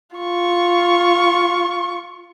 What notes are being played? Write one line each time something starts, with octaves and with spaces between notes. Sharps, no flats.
F4 C#6